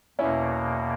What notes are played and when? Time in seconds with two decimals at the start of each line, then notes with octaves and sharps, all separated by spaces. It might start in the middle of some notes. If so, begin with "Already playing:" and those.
0.19 E2 B2 A#3 C#4 E4